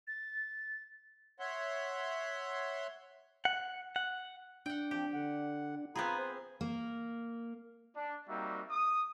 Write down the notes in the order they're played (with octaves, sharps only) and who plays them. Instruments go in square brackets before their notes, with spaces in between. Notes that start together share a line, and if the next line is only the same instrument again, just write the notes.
[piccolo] A6
[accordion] C#5 E5 F#5 C6
[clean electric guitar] F#5
F#5
[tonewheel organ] D4 [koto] F#5 G5
[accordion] F3 C4 [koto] G4
[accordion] D3 F#5
[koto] B3 C4 G#4 [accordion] F4 A#5 B5
[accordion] C5
[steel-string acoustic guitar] A#3
[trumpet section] D4
G3 A#3 C4 D#4 F#4 E5
D#6